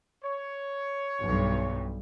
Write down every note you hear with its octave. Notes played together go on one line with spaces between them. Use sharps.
C#5
B1 G2